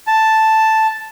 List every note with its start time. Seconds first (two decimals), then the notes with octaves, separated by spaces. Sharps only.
0.07 A5